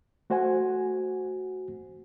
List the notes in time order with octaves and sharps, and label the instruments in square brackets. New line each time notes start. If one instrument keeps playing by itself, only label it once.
[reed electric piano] A3 F#4 C5 F#5 G#5